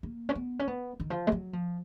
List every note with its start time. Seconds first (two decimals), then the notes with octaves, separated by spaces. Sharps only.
0.03 A#3
0.29 C#4
0.35 B3
0.59 C#4
0.68 B3
1.00 D#3
1.10 F3
1.27 G#3
1.32 F#3
1.53 F3